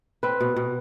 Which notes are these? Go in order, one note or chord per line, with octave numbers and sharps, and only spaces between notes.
C4 B4
B2
B2